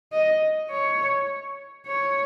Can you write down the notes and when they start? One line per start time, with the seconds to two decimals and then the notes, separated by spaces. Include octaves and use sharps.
0.12 D#5
0.70 C#5
1.87 C#5